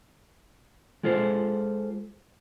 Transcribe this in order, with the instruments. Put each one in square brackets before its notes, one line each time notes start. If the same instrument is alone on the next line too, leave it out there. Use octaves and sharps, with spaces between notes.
[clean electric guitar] G#3 F4 A4 C5